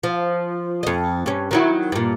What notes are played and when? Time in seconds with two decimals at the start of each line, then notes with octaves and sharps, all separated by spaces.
0.03 F3
0.83 F2 D#5
1.26 G2 C#4
1.51 D#3 F#3 E4
1.92 G2 A#2